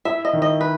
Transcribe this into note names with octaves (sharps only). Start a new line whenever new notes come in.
E4 E5
D#5
D#3
D#5
B4